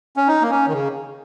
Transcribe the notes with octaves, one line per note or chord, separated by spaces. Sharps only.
C#4
D#4
A#3
C#4
D#3
C#3